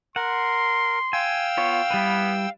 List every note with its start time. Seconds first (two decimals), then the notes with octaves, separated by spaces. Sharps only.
0.16 A#4 F#5 C6
1.13 F5 G5 G#5 E6
1.57 B3 F4 C#5
1.91 G3 B3 E4 B4